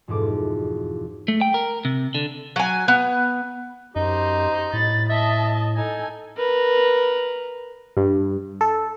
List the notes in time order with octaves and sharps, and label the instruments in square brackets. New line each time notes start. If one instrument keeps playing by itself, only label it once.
[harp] E1 F2 G#2 D6
[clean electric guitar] A3
G5
A#4
C3
D3
[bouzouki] F#3 G#5
B3
[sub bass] F#2 [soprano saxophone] D#4 [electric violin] G4 C5
[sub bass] A2 [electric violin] B5 A6
[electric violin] D#5 A5 [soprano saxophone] E5
[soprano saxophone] D#4 [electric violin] A4 G#5
[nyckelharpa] A#4 B4
[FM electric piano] G2
A4